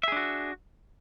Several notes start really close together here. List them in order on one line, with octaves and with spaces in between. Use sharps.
E5 G#4 D4 F#4